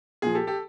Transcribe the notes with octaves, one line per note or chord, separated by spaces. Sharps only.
A#2 F3 G#4
G4 A4
G4 A4